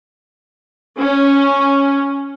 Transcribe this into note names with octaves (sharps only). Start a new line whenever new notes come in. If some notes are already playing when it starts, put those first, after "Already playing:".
C#4